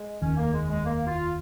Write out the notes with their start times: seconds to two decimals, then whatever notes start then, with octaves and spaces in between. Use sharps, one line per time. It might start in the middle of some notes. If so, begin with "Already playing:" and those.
Already playing: G#3
0.21 F1 D#2 D#3 C#4
0.37 A#3
0.53 G#3
0.70 G#3
0.85 A#3
1.07 F4